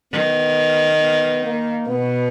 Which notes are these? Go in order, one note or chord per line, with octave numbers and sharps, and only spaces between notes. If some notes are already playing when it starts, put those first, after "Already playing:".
D#3 B3
B3
A#3
B2 B3